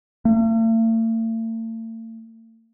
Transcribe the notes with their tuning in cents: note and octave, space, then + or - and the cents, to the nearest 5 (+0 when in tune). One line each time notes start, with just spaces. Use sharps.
A3 +45